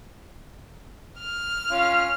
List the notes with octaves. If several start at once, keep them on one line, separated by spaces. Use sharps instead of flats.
F6
C#4 F4 F5